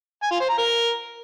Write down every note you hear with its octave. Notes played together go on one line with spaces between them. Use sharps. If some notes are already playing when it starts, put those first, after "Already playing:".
G#5
F4
C5
A#5
A#4